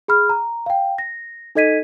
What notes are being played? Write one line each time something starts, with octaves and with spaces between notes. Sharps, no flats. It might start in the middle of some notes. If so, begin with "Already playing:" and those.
G#4 B5 F6
A#5
F5 G5
A#6
D#4 A4 D#5 G#6 B6 D#7